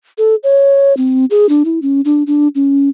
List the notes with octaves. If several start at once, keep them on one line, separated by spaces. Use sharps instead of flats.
A4
C#5
C4
G#4
D4
E4
C#4
D4
D4
C#4